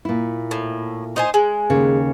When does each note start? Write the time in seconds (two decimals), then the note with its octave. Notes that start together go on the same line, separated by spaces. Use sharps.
0.05 A#2 E4
0.51 A2
1.16 D#4 C5 G#5
1.34 G#3
1.70 D#2 C#3